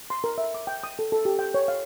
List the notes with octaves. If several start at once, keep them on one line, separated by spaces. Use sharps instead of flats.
C6
A#4
E5
D6
G5
D#6
A4
A4
G4
G5
C#5
F5